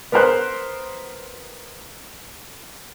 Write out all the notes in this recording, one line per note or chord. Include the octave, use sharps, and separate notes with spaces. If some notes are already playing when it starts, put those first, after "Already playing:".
B3 A#4 C5 F#6